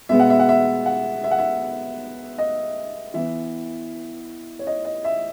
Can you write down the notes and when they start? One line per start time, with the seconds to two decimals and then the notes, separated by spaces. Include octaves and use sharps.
0.09 B2 G#3 B3 E5
0.20 F#5
0.30 E5
0.40 F#5
0.49 E5
0.86 F#5
1.24 E5
1.31 F#5
1.38 E5
2.38 D#5
3.14 E3 B3 E5
4.59 C#5
4.67 D#5
4.85 D#5
5.05 E5